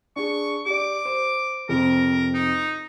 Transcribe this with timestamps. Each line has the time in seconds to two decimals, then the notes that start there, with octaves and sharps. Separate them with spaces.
0.16 D4 G#4 C#6
0.66 G4 D5 D6
1.05 C5
1.69 F2 C3 C4 A#4
2.34 D#4